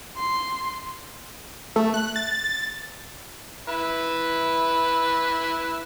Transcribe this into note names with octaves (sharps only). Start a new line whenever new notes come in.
C6
A3
F#6
A6
E4 B4